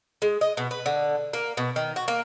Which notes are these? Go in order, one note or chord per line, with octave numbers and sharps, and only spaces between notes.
G#3
D#5
B2
B4
D3
A#3
B2
D#3
F#4
A#3